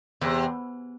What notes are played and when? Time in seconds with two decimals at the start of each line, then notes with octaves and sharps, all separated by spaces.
0.21 E2 C3